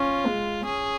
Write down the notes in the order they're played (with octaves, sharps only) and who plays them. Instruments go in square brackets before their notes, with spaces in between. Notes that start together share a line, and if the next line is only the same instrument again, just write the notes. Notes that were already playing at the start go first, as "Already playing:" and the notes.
Already playing: [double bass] C#4 [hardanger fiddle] F4
[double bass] G#3
[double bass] C#4 [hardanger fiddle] G#4